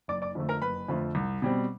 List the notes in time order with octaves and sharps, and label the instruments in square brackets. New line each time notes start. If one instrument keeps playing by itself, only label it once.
[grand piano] F#1 D5 D6
D5 D6
F2 D3 F3 A3
A#4 A#5
F#1 B4 B5
F2 D3 F3 A3
C2
B2 G3 C4